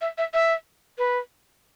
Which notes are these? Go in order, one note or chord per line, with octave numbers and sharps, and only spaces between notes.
E5
E5
E5
B4